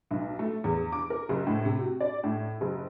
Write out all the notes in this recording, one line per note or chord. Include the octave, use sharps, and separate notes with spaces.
B1
A3
E2
D6
A#4
F#1
A2
C3
F#4
D5
A2
F#1